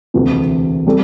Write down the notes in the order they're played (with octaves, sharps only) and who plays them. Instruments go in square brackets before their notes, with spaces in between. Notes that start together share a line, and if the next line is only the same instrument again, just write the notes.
[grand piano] E1 D2 C3 E3
G3 C4 A4